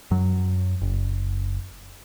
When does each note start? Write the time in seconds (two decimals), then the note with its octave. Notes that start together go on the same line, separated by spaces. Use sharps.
0.11 F#2 F#3
0.82 F#1